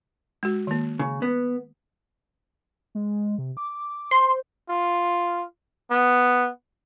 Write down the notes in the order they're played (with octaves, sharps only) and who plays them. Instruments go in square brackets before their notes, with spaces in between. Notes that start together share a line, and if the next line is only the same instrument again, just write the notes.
[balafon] G#3 F#4
D#3 A#3
[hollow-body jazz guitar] C#3
B3
[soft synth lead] G#3
C3
D6
[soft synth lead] C5 [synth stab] C6
[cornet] F4
B3